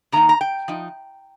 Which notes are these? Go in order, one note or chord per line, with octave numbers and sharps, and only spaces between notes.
C3 D#3 A#3 D#4 A#5
A#5
G5
F3 D#4